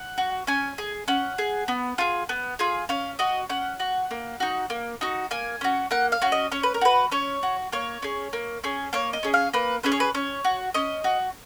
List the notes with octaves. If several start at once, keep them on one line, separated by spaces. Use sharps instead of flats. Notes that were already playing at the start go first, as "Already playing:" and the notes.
Already playing: F#5
F#4
C#4 G#5
G#4
C#4 F#5
G#4
B3
F4 G#4
B3
F4 G#4
C#4 F5
F#4 D#5
C#4 F#5
F#4
A#3
D#4 F#4
A#3
D#4 F#4
A#3 G#5
C#4 F#4
A#3 F#5
F5
C#4 F#4
D#5
C#4 C#5
B4
A#4
F#4 B4
C#4 C#5
F#4
A#3 C#5
C#4 G#4
A#3
C#4 G#4
A#3 C#5
D#5
C#4 G#4
F5
A#3 B4
C#4 G#4 B4
C#5
B4
C#4 C#5
F#4
C#4 D#5
F#4